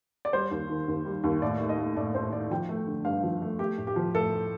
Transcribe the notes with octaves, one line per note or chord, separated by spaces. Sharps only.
D5
G3 C5
D#2
D#3
D#2
G3
D#2
A2 D5
A3
D#5
A3
A2 D5
A2 C5
A3 D5
F3 G5
A3
D3
G2 F5
F3
A3
A3 G4
A2
G4
F3
A2 A4
A3